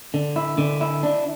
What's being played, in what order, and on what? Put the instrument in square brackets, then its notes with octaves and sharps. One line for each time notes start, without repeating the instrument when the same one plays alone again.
[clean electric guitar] D3
E4
D3
E4
D4